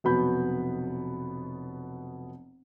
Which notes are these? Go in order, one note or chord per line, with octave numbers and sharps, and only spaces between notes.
F1 B2 F#3 B3 B5 G6